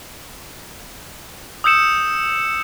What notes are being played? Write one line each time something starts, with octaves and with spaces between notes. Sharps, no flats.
D#6 E6 G6 C#7 E7